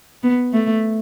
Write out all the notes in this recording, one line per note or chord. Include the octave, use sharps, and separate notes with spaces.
B3
A3